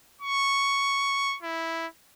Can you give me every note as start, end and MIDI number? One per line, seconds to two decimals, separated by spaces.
0.21 1.37 85
1.43 1.87 64